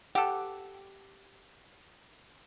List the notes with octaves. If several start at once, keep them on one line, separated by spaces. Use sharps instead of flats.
G4 A4 F#5